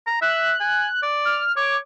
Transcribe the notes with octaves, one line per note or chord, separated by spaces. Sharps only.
A#5
E5 F#6
G#5
D5
F6
C#5 D6